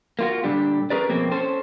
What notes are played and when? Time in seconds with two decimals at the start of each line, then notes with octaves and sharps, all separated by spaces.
0.19 A#3 F4 F#4
0.43 A#2 D3 G3 D4 G4
0.90 C#4 G#4 A#4 B4 D5
1.09 F2 B2 A#3 C4
1.31 C#4 A4 C5